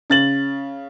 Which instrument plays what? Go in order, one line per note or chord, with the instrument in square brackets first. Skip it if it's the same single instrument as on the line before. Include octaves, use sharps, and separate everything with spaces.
[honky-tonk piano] C#3 A6 F#7